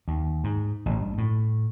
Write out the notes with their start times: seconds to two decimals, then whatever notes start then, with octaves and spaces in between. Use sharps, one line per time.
0.08 D#2
0.44 G#2
0.86 A1
1.00 G2
1.18 A2